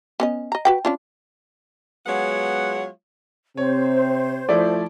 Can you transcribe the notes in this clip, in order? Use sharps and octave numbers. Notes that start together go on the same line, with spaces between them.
B3 C#4 D#5
D#5 A#5
F#4 B4 G5
C#4 D4 F4
F#3 G#3 B3 F4 C#5 F#5
C3 C4 C5 C#5
F3 A3 E4 D5